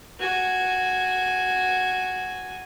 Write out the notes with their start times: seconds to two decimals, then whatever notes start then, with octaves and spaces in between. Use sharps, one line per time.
0.19 F#4 G#5